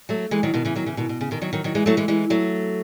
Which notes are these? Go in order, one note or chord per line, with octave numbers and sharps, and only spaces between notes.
F#3 A3
E3 G#3
D#3 F#3
B2 D#3
C#3 E3
D#3 F#3
C#3 E3
B2 D#3
B2
C#3
B2 D#3
D#3 F#3
D#3 F#3
D#3 F#3
E3 G#3
F#3 A3
E3 G#3
E3 G#3
F#3 A3